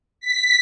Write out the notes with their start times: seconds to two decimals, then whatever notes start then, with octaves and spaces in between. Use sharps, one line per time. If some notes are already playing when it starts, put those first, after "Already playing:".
0.21 B6